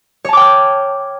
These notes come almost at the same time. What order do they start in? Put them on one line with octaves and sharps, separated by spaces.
C#5 A5 D6 G5 F6